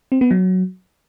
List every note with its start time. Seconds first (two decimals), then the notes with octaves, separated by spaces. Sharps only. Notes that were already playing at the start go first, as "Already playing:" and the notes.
0.12 C4
0.21 B3
0.31 F#3